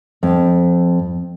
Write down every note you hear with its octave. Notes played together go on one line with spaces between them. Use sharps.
F2